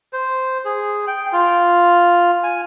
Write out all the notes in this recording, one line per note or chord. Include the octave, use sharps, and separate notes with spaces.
C5
G#4
G5
F4
G#5